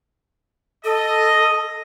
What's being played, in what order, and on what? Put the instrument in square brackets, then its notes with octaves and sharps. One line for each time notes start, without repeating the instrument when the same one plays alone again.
[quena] A4 [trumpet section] D#5